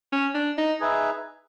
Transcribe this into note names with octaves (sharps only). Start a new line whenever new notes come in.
C#4
D4
D#4
D#4 G#4 B4 E5